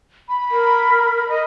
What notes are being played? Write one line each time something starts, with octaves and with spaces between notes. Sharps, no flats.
B5
A#4
D#5